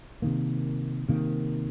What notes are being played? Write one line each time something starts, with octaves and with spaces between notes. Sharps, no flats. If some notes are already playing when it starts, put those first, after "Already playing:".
C3 D#3 A#3
C3 D#3 A#3